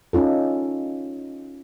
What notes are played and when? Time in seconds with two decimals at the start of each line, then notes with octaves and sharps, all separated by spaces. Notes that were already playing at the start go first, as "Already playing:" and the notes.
0.13 C#4 D#4 F4 A4